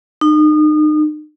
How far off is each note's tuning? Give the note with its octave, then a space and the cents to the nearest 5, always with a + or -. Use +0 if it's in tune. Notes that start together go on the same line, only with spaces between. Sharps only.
D#4 -35